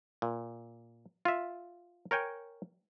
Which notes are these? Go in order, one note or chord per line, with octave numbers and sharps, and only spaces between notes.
A#2
F4 E5
A#4 C#5 G5 G#5